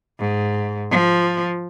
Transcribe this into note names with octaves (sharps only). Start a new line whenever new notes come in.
G#2
F3